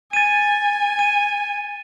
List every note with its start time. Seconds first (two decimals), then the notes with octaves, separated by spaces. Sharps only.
0.13 G#5 A6 D#7
0.99 D#7